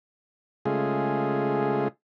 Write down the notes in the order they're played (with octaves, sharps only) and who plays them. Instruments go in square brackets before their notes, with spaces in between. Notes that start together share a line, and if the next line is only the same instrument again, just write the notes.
[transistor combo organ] C#3 G#3 A3 F4 G#4